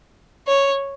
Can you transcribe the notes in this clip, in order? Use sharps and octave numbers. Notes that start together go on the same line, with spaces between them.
C#5